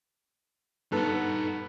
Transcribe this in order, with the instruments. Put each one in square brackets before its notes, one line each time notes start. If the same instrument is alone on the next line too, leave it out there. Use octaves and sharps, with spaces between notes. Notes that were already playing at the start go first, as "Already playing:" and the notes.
[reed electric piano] G2 A4 [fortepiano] B3 [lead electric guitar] D#4 F#5